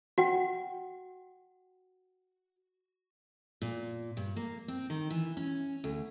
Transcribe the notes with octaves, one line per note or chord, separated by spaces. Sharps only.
F#4 F#5 G5
A#2
G2
A#3
C4
D#3
E3
C#4
D2